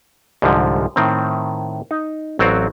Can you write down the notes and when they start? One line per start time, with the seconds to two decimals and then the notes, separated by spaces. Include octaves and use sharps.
0.42 C2 G#2 D3 F3
0.96 A2 D#3 C4
1.91 D#4
2.39 A1 F#3 C4 F#4 D5 F5